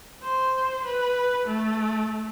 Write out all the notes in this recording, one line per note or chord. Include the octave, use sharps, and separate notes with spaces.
C5
B4
A3